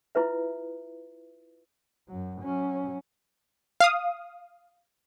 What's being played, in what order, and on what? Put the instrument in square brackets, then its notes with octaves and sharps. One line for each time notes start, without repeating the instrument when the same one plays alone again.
[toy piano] E4 F4 B4 E5
[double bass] F#2 F#3
F#3 C#4
[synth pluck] F5 D#6